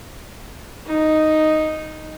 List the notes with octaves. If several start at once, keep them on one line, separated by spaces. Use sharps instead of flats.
D#4